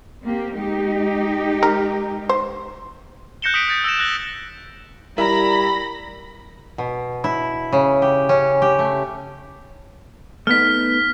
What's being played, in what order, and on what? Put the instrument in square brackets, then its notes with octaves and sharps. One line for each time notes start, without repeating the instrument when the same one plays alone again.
[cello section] A#3 C4 G4
G#3 D#4 G4
[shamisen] A#4
C5
[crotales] F#6 G6 A#6 C#7 E7 G7
D#6 B6 D7
F#6 G6 A6 A#6
E6 G6 A#6 E7
E6 F#6 A#6 F#7
[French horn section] G3 [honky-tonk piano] E4 A#5 [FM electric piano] A#4 [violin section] B5 A#6
[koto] B2
E4
C#3
G4
C#4
G4
A3
[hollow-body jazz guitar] A3 B3 D#4 [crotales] F6 B6